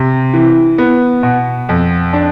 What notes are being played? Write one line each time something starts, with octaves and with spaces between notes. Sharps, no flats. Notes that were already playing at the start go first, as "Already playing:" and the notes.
Already playing: C3
E3
B3
B2
F2
D4